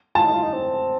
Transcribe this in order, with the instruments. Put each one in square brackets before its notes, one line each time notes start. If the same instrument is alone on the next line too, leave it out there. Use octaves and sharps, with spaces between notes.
[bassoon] F4 [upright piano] A5
[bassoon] D#4
F4
D#4
C4